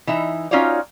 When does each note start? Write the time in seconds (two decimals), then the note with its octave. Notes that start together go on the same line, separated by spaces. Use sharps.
0.07 E3 D#4 E5
0.51 C#4 D#4 F4 F#4 C#5 D5